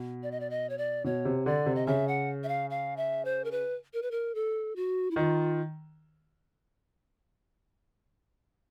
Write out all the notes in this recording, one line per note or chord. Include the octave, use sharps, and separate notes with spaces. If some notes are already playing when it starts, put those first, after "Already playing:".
Already playing: B2
D5
D#5
D5
D#5
C#5
D5
B2 C#5
C3
D3 D5
C3
D#5
C#3 E5
F#5
E5
F5
F5
E5
C5
A#4
B4
A#4
B4
A#4
A4
F#4
E4
D#3 F4